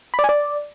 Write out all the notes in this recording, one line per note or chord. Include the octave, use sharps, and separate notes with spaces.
B5
D5
G#5
D5